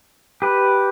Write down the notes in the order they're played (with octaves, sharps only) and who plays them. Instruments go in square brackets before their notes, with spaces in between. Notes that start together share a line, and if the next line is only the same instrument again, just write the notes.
[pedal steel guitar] G4 B4